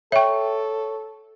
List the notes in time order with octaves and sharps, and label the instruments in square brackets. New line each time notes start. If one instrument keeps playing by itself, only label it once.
[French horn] A4 [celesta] C#5 C#6 [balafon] E5 G5